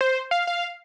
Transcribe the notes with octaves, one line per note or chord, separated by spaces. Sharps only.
C5
F5
F5